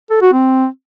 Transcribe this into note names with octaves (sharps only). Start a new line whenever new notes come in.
A4
F#4
C4